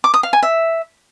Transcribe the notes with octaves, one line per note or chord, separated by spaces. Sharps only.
D6
D#6
F5
G#5
E5